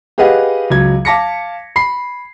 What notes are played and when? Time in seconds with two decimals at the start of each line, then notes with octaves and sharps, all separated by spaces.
0.18 G4 G#4 B4 D#5 F5 F#5
0.70 C#2 F#3 G#6
1.05 F5 A5 D6 A#6 B6 C#7
1.76 B5 C7